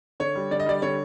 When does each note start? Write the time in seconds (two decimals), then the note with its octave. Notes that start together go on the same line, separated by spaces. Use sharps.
0.20 D3 C#5
0.35 G3
0.51 D3 D5
0.60 D#5
0.66 G3 D5
0.82 D3 C#5